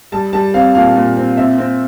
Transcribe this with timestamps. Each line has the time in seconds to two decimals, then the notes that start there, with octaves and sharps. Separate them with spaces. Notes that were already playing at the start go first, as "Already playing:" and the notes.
0.12 G3 A5
0.33 G3 A5
0.54 C4 F5
0.75 A#2 F5
0.96 A#2
1.17 C4
1.37 C4 E5
1.58 C4